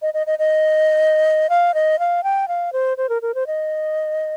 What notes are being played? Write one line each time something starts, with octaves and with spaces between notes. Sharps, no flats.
D#5
D#5
D#5
D#5
F5
D#5
F5
G5
F5
C5
C5
A#4
A#4
C5
D#5